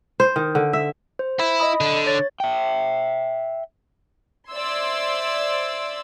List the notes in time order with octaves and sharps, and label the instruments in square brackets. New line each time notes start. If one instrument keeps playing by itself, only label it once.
[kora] C5
D#3
D3
E5
[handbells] C5
[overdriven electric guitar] E4
[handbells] D#5 B5 D#6
[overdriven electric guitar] D3
[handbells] C#5 A6
[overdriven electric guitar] E5 G5
[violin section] C5 D5 E5 C6 E6 G#6